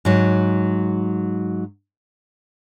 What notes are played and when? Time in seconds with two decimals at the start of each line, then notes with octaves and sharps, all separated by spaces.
0.05 G#2 F#3